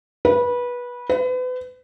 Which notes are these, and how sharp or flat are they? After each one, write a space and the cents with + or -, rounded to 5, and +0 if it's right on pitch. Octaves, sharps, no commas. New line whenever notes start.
B4 -20
B4 +35